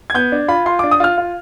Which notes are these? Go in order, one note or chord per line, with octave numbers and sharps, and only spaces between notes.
G#6
B3 G6
D4
F4 B5
F4 C6
D4 D6
D#6
F4 F6
F4